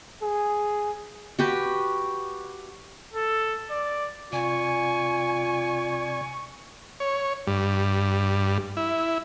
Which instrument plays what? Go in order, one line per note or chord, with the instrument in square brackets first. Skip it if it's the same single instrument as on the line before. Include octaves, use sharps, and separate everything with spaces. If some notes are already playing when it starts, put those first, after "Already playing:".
[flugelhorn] G#4
[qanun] F#4 G4 B4
[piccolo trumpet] A4
D5
[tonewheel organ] C3 D5 G#6 [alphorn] F4 [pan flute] G#5 [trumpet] C#6
[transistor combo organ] C#5
G2
E4